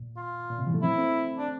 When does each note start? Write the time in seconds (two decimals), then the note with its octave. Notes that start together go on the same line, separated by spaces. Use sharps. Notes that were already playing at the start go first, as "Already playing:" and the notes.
Already playing: A#2
0.17 F4
0.50 A#2
0.58 A2 C3
0.67 E3 G3
0.74 F3 A3
0.82 C4 E4
0.97 A3 C4
1.38 D4